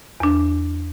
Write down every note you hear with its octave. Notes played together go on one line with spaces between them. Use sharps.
E2 D4